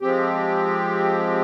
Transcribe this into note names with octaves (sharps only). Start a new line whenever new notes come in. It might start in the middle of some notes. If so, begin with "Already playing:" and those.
F3 G#3 C4 G4